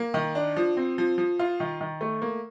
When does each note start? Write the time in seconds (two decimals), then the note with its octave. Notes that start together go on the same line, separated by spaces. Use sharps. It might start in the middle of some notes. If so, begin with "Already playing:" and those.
Already playing: A#3
0.14 D#3
0.35 D4
0.56 F3
0.77 C4
0.98 F3
1.18 F3
1.39 F4
1.60 D#3
1.81 D#3
2.01 A3
2.22 A#3